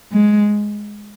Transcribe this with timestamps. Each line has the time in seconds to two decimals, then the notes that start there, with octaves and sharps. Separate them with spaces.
0.12 G#3